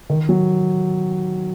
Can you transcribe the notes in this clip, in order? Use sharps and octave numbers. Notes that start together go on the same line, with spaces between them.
D#3
F#3